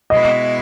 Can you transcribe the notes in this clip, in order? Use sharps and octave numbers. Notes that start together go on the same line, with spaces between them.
B2 G#3 B3 E4 D#5